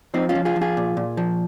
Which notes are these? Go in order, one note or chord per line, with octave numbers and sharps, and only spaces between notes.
F3 C4 D#4
C#4 F4
F3
F4 G#4
F3
F4 G#4
A#2
A#2
F3